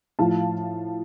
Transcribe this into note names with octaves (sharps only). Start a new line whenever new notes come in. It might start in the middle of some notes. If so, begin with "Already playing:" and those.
A2 F3 F5 A5